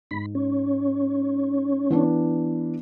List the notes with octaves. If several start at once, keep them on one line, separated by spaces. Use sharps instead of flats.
G#2 B5
C#4
E3 B3 D4